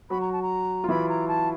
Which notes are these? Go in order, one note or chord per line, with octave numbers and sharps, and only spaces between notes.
F#3 F#4 B5
A#5
A5
A#5
F4
E3 E4 B5
A#5
A5